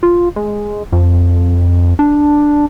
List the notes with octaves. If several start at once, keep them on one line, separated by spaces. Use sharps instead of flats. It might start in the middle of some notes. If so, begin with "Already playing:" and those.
F4
G#3
F2
D4